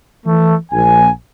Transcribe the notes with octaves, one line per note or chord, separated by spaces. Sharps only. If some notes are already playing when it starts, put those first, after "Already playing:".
E3 A3
A#1 G#5